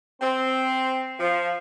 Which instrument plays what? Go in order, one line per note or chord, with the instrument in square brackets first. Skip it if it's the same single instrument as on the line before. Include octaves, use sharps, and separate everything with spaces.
[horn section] C4
F3